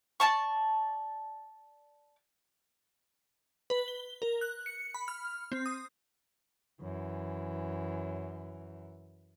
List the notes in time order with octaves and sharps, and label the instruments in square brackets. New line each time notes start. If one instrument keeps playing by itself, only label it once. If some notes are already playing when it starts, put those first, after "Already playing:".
[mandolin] D5 A5 C#6
[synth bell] B4
G7
A#4
F#6
C#7
B5
F6
C4
D#6
[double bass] F#2 E3